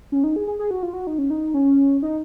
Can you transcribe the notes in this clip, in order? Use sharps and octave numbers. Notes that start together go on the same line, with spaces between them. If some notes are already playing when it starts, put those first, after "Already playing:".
C#4
D#4
G#4
G#4
G#4
F#4
F4
F#4
D#4
C#4
D#4
C#4
D#4